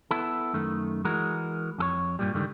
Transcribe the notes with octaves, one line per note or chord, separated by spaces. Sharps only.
B3 E4 A4
F#2 D#3 A3
E3 G#3 F#4 A#4
F2 A4 C#5
G2 A#2 G3
C#2 G2 D3 D#3 G3